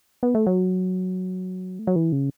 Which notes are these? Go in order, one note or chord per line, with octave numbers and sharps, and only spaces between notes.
B3
A3
F#3
A3
F#3
E3
C#3